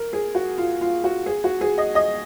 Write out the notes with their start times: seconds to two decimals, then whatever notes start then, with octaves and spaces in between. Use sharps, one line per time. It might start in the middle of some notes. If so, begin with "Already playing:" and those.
Already playing: A#4
0.13 G#4
0.35 F#4
0.58 F4
0.81 F4
1.04 F#4
1.26 G#4
1.44 F#4
1.61 G#4
1.78 D#5
1.95 D#5